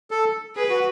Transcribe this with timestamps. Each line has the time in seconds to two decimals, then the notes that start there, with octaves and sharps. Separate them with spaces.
0.11 A4
0.56 G#4 B4
0.69 F#4